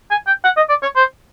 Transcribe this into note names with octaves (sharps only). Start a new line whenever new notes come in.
G#5
G5
F#5
D#5
D5
C#5
C5